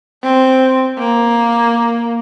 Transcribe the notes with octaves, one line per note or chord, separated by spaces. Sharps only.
C4
A#3